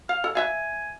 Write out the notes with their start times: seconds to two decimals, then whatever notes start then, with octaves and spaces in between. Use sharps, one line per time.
0.09 F5 F6
0.24 A4
0.35 B4 E5 F5 G#5